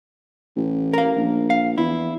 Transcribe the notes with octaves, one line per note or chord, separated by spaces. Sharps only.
A1
A#4 F5
A#1
F5
E2 E4